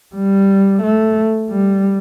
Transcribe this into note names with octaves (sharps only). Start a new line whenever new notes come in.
G3
A3
G3